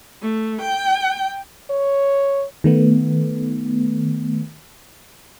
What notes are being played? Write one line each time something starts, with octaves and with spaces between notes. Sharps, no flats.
A3
G5
C#5
D#3 A3 B3